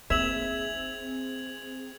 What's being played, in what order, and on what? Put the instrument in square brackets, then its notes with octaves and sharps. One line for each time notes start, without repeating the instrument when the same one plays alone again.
[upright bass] A#3 D#4 [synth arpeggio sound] C4 G#4 [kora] E5 [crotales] G#6 F7 F#7